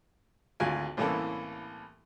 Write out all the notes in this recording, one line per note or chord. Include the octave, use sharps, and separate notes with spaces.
G#1 D2 F4 G#5
C2 A2 E3 A#3 C#4 A4